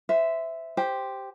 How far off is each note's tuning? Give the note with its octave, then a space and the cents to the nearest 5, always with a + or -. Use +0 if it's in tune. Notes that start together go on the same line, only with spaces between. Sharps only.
C5 -30 E5 +0
G4 +0 C5 +0